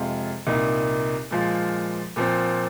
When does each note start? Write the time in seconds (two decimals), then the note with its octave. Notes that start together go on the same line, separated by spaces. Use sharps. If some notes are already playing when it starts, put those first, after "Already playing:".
Already playing: F2 C3 G#3 F4
0.47 C2 A#2 A#3 D#4
1.31 A#2 F3 G#3 F4
2.16 A#2 F3 C4